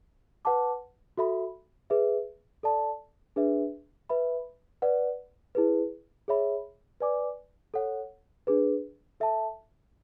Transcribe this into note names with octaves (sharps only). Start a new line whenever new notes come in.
B4 F#5 A5 D6
F#4 A4 E5 B5
G#4 B4 E5
A4 D5 A5
D4 G#4 B4 E5
B4 E5 B5
B4 D5 F#5
E4 G#4 B4
G#4 C#5 E5 B5
B4 D5 G#5 D6
A4 C#5 F#5
D4 G#4 B4
A4 E5 A5